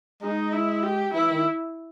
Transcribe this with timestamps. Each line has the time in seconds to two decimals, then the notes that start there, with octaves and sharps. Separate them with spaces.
0.22 G#3 D#4
0.53 E4
0.83 G4
1.14 E3 E4
1.30 D#3